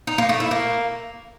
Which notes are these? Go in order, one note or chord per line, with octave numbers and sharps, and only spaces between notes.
D#4
A#3
A3
E4
A#3